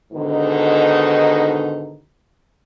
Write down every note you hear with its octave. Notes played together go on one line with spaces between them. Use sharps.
G#2 B2 D3 D#3 D#4